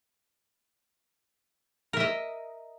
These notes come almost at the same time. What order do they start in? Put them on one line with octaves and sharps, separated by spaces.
A#4 E5 D#5